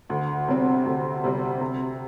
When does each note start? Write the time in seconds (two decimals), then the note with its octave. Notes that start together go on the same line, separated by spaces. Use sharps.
0.10 D2
0.48 C3 G3 C4
0.86 D2
1.24 C3 G3 C4
1.61 C3